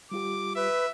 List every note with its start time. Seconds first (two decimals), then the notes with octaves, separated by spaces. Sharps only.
0.11 G3 F4 G4 D6
0.55 B4 E5